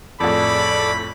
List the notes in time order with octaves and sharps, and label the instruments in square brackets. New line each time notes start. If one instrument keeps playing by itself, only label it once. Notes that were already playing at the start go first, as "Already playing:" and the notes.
[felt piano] F2 A2 [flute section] G#4 D5 [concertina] A4 D6 [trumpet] B5